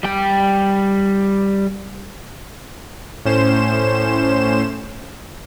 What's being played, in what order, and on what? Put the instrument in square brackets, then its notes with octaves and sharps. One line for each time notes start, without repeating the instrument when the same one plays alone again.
[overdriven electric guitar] G3 G5
[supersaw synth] A2 C#4 C5 E7